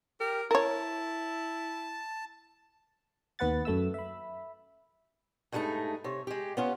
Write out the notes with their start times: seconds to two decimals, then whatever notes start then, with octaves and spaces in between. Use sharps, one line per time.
0.20 G4 A#4
0.51 E4 A#4 C#5 A5
3.39 D#2 B3 B4 F#5 A6
3.65 F#2 A3 E5 E6
3.94 E5 B5
5.52 G2 G#3 A3 B3 D#4
6.04 C3 C#5
6.27 G#3 G4
6.57 B3 C#4 F4